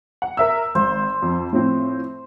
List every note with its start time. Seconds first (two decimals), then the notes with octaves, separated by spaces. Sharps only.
0.22 F#5
0.37 A#4 E5 E6
0.75 G#1 C5
1.22 F2
1.53 A2 F3 C4